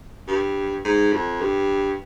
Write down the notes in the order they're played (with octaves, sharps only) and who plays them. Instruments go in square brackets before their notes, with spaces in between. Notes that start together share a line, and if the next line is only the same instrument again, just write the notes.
[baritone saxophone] G2
G#2
F2
G2